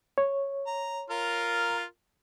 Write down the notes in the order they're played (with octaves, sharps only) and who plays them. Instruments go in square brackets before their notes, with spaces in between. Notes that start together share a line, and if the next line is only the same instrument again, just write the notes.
[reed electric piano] C#5
[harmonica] A#5
F4 A#4